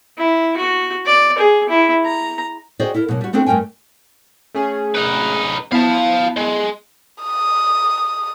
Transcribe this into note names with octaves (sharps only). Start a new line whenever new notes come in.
E4
F#4
D5
G#4
E4
A#5
F#4 G#4 C5 D5 D#5 G5
E4 A4 A#4
B2 F#3 A3 A#3
G3 F#4
A3 B3 C4 D4 F#4 A4
G2 A3 A#4 G5 G#5
A3 C#4 G#4
D#4 B4
B3 E4 F5 A5
G#3
D#6